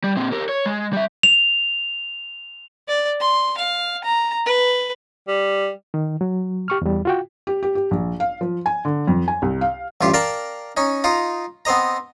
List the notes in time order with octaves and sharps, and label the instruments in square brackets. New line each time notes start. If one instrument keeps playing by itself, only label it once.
[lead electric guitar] G3
A#2 C4
G4 A#4
C#5
G#3
G3 E5
[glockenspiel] F7
[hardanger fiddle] D5
C6
F5
A#5
B4
[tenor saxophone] G3
[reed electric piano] D#3
F#3
G4 C#6 F6
E2 G3
F4 F#4 G5
[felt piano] G4
G4
G4
A#1
F5
F3
G#5
D3
F2
G#5
C2
F5
[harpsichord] A1 G2 F4 G4
A#4 D5 F5 G5 A5
C#4 D#4
D#4 F4 A#5
B3 C4 C5 D#5 A#5